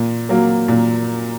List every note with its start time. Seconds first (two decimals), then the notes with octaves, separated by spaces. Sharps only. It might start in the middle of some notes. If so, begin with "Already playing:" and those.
Already playing: A#2
0.29 F#3 A#3
0.68 A#2